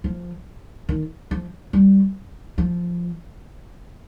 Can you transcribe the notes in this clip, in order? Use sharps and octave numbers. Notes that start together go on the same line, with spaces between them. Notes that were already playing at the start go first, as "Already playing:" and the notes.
F3
D#3
F3
G3
F3